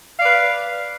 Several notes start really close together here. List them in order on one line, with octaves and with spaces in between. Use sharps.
F5 D5 B4